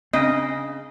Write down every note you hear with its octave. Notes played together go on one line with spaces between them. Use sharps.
C#3 C4 D4 D#5 C7